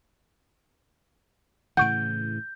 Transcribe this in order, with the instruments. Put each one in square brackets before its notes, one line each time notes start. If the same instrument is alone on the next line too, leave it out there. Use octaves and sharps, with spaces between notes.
[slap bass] A2 C#3 E3 [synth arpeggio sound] F#5 C#6 D7 [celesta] G6